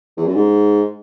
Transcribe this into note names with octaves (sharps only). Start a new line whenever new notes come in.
E2
F#2
G#2